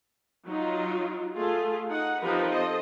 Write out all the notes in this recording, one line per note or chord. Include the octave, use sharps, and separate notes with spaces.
F#3 D#4 F4
A3 F4 G#4
D#4 F#5
F3 C4 D#4 G4 A#4 B4
A4 C5 D#5